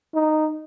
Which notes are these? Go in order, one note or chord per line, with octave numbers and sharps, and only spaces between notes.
D#4